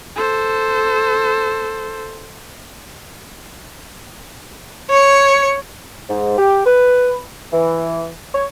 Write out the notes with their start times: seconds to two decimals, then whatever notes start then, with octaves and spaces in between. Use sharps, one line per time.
0.16 A4 C5
4.90 C#5 C#7
6.09 G#2
6.38 G4
6.66 B4
7.53 E3
8.35 C#5